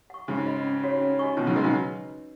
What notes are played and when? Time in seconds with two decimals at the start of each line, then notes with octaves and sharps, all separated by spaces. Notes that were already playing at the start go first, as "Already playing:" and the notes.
0.10 F#5 C#6
0.28 G#2 C#3 F#4
0.47 D#5 B5
0.64 C#4
0.83 F#4 C#5 F#5
1.01 C#4
1.19 F#4 D#5 G#5 C#6
1.37 B2 D#3 D#4
1.47 C#3 F#3
1.55 D#3 G#3 B4 D#5
1.64 C#3 F#3